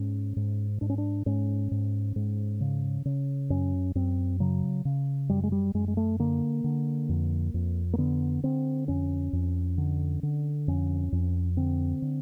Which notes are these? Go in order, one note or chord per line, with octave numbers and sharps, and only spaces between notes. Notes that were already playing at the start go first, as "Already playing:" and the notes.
Already playing: G#2 C#4
G#2
G#2 D4
C#4
D4
G#2 C#4
G#2
G#2
C#3
C#3
F#2 C#4
F#2 C4
C#3 F#3
C#3
F#2 G3
G#3
G3
F#2 G#3
G#3
A3
D3 A#3
D3
F2
F2
A#3
D3 B3
D3 C4
F2 C#4
F2
D3
D3
F2 C#4
F2
D3 C4
D3